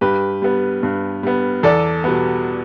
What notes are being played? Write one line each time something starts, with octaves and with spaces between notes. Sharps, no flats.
G2 G4 B4
G3 B3
G2
G3 B3
E2 A4 D5
B2 G3 B3